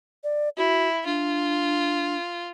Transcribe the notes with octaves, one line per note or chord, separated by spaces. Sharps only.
D5
E4 F#4
D4 F4